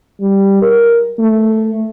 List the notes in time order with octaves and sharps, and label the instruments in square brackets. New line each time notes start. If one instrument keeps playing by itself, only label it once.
[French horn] G3
A#4
A3